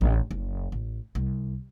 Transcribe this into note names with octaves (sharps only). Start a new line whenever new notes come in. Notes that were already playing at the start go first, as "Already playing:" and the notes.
A1
F#1
A1
C2